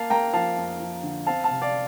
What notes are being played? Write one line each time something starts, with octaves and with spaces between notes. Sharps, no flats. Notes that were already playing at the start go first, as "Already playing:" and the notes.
Already playing: A#3 F5 A5
A#3 G5 A#5
F3 F5 A5
F2
F3
D3
C4 F5 A5
F5 A5
C3
D5 F5